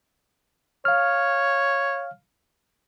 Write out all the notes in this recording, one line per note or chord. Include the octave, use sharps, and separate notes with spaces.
C#5 F5 F6